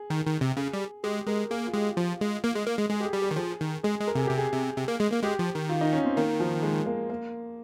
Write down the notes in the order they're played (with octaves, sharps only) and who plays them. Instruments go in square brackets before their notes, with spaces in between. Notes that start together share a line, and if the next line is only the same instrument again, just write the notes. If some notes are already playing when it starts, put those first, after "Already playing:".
Already playing: [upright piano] G#4
[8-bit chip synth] D#3
D#3
C3
[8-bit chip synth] C#3 [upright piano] G#4
[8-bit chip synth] G3
[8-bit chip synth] G#3 [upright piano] G4
[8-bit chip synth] G#3 [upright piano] A#4
[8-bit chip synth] A#3 [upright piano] G#4
[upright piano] F4
[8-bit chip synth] G#3 [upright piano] G4
[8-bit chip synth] F3 [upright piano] F4
[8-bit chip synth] G#3
A#3
G#3
A#3
G#3
[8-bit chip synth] G#3 [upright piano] G#4
[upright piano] G4
G#4
[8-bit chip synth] G3
[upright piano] G4
[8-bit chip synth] D#3
[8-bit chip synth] F3 [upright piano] G#4
[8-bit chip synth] D#3
[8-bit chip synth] G#3 [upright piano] G#4
[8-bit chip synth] G#3
[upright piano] A#4
[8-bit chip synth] C3 [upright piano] G#4
[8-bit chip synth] C3 [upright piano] G4
[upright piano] G#4
[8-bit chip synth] C3
C3
A#3
G#3
A#3
[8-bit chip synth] G#3 [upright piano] G4
[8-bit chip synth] F3
D#3
[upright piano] F4
D#4
C#4
C4
[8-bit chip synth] D#3 [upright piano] A#3
[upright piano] F3
G#3
A#3
A#3